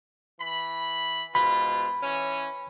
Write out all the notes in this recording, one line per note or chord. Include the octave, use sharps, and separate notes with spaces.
E3 B5
G#2 B2 F4 B5
E3 C#4